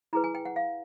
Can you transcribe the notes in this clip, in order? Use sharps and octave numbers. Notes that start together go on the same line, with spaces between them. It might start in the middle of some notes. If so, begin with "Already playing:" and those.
E4 G#4 B4 A#5
G#5
G5
F#5
F5